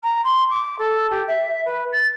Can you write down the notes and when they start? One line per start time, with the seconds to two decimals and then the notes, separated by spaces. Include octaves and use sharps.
0.03 A#5
0.24 C6
0.50 D6
0.78 A4
1.10 G4
1.27 E5
1.65 B4
1.92 A6